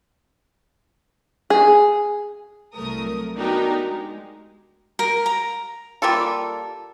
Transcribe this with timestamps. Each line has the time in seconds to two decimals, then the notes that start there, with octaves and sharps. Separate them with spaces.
1.50 G#4
2.74 C2 F#3 A3 A#4 D#6
3.35 B3 D4 D#4 F#4 G4 A#4
3.75 G#3
4.99 A#4
5.26 A#5
6.02 G3 A#3 F4 A4